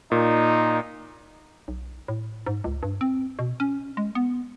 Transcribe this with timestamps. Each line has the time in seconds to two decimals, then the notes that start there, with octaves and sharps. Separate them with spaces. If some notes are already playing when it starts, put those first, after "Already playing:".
0.12 A#2 D#4
1.68 B1
2.08 A2
2.47 G#2
2.64 C#2
2.83 G2
3.01 C4
3.39 B2
3.60 C#4
3.97 G#3
4.15 B3